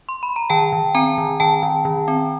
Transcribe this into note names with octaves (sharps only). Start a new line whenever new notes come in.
C6
B5
A#5
D#3 G5 A5
D#3
C4 G#5 A#5
D#3
D#3 G5 A5
D#3
D#3
C4